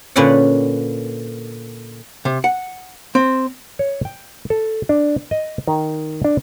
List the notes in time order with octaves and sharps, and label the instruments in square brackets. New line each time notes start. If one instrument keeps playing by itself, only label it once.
[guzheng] A#2 D3 C#4 B4 D5 F#5
[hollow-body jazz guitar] C3
F#5
C4
[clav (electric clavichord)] C#5
G5
A4
D4
D#5
D#3
D4